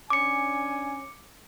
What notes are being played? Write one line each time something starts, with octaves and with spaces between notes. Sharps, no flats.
C#4 D4 G#5 D6 C#7